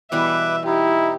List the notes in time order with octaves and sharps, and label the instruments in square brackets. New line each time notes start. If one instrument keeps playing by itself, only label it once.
[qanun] B2 E3 G3 [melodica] B4 D6 [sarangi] E5
[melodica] D#4 [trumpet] E4 [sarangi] G4